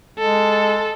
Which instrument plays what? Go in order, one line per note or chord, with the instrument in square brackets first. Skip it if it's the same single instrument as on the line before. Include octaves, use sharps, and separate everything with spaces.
[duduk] G#3 [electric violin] A4